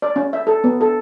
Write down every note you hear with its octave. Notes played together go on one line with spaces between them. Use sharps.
D5
C#4
E5
A4
B3
A4